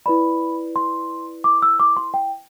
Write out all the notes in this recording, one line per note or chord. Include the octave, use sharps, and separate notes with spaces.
E4 B4 D5 B5
C6
D6
E6
D6
C6
G5